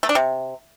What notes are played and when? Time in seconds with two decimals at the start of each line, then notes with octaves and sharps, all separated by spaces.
0.03 A3
0.09 D4
0.15 C3